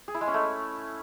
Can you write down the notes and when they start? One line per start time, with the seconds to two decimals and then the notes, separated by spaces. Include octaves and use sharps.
0.08 G#4
0.14 E4
0.21 G#3
0.27 C#4
0.34 A3